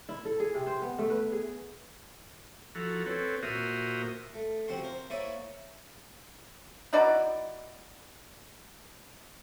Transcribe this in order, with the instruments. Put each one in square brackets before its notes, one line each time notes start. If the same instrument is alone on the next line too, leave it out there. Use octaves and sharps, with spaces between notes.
[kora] E4
A4
G#4
C3
C5
B3
A3
B4
G#4
[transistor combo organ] F3 E4 F#4 A4 A#5
C4 A4 B4 C#5
A#2 F#4 A#4 C5 E5 D#6
[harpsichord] A3
C3 F3 C4 F#4 F#5 C6
A#4 C5
A#3 E4 C#5 D5 E5 G#5
[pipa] D#4 E4 F#4 D5